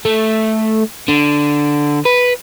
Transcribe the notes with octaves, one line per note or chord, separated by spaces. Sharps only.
A3
D3
B4